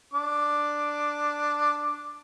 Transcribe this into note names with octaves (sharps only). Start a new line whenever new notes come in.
D4 D6